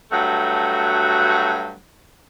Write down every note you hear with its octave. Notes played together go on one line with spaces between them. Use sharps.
G2 F#3 A3 F#4